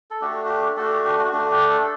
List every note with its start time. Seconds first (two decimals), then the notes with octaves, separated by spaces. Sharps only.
0.11 A4
0.21 A3 D4 F#4 G4
0.45 F#4
0.49 G4
0.76 A3 D4 F#4 A4
0.91 G4
1.05 G4
1.19 F#4
1.33 A3 D4 F#4
1.51 G4
1.70 A4